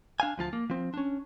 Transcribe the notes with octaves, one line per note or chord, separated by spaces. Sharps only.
D4 F5 G#5
D2 F3 F4 A5
A#3
F3 C4
C#4 D4